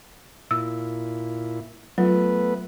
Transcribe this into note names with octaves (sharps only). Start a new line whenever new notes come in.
A#2 E4 E6
F#3 A3 B3 F4 B4